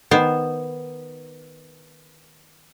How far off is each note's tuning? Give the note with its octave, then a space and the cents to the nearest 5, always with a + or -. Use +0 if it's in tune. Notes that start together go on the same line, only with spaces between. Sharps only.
D#3 +0 B3 +0 C5 +0